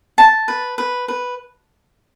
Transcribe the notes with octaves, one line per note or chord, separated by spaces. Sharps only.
A5
B4
B4
B4